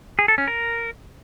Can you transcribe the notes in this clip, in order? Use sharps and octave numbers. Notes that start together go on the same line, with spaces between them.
G#4
A4
C#4
A#4